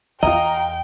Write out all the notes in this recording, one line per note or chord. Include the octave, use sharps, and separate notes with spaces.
E2 F4 D#5 G5 A#5